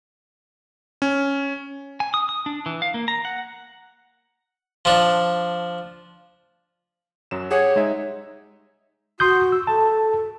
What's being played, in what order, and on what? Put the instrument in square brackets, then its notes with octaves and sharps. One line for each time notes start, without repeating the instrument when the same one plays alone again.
[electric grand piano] C#4
[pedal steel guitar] G#5
D#6
D#6
D4
E3
F5
A#3
A#5
F#5
[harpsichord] F3 D4
[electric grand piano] F#2 F#3 E7
[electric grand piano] G4 G#4 F#5 [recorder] C#5
[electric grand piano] G#3 D#4 E5
[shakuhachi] F#4 [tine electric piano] C6 D#6 G6
[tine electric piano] E6
[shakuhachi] A4 [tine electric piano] A5